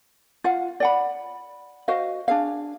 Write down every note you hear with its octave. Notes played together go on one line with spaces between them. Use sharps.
F4 F5 F#5
D5 F#5 B5
F#4 C5 D#5 F5
D4 G#4 F5